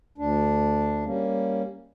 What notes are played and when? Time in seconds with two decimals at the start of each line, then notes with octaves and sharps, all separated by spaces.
0.18 D2 D4
1.05 G3 A#3 C#4